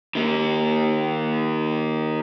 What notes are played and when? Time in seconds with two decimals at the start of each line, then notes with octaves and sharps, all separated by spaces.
0.15 D#3 A#3